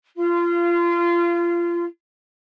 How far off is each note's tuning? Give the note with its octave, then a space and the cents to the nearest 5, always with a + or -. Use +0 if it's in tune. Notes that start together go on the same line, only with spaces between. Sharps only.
F4 -25